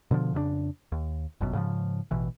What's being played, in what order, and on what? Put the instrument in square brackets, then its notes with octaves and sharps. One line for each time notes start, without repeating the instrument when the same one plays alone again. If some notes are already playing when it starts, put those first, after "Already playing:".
[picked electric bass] B2 D3 D#3 F3
F2 C#3 B3 D4
D#2
G1 F#2 B2
G#2 C#3 E3 F3
A1 B2 E3